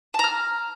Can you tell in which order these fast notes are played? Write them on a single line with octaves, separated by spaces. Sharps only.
A5 A#5 F6